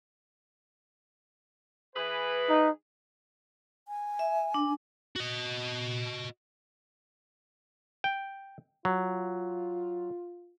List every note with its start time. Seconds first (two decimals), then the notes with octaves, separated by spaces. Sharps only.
1.96 E3 G#4 B4
2.50 D#4
3.88 G#5
4.19 E5
4.54 D4
5.16 F#4 D#5
8.04 G5
8.85 F#3 F4